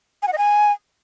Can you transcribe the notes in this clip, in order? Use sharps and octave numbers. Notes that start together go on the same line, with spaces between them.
G#5
F#5
D#5
G#5